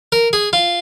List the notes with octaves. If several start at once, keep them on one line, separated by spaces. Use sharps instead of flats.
A#4
G#4
F4